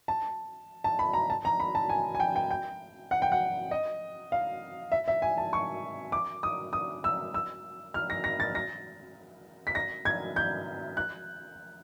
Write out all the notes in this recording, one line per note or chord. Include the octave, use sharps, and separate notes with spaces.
A5
A5
B5
A#5
A5
A#5
B5
A5
G#5
G#5
G5
G5
G5
F#5
G5
F#5
D#5
F5
E5
E5
G#5
A5
C#6
D6
D#6
D#6
E6
E6
F6
A#6
A#6
A6
A#6
B6
A#6
G#6
G6
F#6